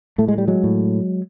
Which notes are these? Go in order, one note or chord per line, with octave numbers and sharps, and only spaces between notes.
A2 A3
G#3
G3
F#3 G#3
A2